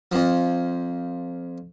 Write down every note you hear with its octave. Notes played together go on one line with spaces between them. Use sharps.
F2 F3